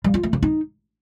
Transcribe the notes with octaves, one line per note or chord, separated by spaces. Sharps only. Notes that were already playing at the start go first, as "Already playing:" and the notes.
G3
F4
A3
C#3
D#4